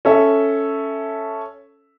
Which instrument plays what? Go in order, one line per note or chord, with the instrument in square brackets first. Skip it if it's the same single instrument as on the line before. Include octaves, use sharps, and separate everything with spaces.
[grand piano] C#4 A4 E5